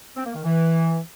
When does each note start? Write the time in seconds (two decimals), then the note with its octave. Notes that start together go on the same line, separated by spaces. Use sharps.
0.16 C4
0.26 A#3
0.35 D#3
0.44 E3